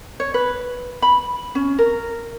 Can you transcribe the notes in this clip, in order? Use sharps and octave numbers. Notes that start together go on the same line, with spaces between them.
C#5
B4
B5
C#4
A#4